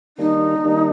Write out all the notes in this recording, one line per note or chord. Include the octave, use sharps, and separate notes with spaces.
D#3 G3 A#3 D4 D#4
D#3 G3 A#3 D4